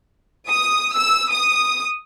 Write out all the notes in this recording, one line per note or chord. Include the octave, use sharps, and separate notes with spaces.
D#6
E6
D#6